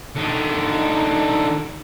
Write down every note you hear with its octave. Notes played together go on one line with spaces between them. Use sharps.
D3 D#4